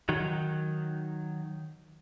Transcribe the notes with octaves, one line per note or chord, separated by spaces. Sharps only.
D#3 F#3